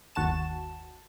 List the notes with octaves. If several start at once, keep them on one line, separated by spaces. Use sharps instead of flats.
G1 D#2 F#4 A5 E7